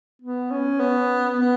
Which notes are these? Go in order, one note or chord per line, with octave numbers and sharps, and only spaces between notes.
B3
C#4
B3
B3